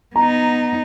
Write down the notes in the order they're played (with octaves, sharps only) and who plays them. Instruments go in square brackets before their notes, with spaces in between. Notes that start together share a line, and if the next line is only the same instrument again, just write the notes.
[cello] B3 D#4 [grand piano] A#5